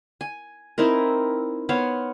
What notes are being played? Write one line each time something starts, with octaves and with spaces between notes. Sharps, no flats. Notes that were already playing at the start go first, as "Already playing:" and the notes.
G#5
C4 D#4 E4 A#4
B3 C5 C#5 F5